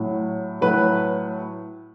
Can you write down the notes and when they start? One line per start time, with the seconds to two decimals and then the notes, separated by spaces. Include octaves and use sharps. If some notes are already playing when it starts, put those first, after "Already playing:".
Already playing: A2 F#3
0.61 A2 F#3 B4